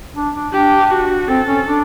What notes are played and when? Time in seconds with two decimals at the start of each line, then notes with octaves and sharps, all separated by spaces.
0.16 D4
0.34 D4
0.53 D4 G4
0.91 F#4
1.28 C4 A4
1.47 C#4
1.66 D4